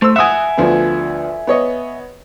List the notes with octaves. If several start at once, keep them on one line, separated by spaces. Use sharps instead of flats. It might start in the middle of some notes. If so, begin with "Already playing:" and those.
A3 C5 E6
E5 F#5 G#5 D#6
D2 F3 B3
B3 C#5 D#5